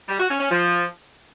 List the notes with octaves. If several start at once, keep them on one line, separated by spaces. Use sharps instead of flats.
G3
F#4
C#4
C#4
F3